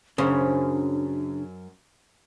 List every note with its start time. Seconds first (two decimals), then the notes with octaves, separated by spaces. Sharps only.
0.18 F#2 C#3 D4 C5